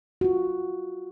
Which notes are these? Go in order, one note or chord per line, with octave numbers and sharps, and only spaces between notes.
F4 F#4